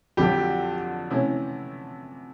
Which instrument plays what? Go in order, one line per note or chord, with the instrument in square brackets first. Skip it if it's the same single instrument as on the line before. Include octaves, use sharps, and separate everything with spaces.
[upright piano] F2 D3 F#3 [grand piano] G4
[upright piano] C3 E3 A3 C#4 E4